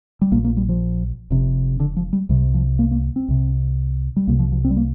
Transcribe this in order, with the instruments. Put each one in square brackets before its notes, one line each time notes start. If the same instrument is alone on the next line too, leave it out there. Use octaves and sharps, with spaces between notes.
[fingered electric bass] G3
A#1 A#2 A#3
A#3
G3
F3
F1 F2 C3
D3
F3
G3
C2 C3 G3
F3
A#3
A#3
C4
C2 C3
G3
C2 C3 A#3
F3
F3
C4
G3
A#3